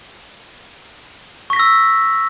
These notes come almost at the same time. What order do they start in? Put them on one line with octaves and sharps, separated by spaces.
C#6 B6 A#6 E6